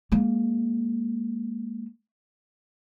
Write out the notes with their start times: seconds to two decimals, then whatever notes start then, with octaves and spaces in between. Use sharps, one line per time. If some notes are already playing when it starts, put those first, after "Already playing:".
0.12 G#3 A#3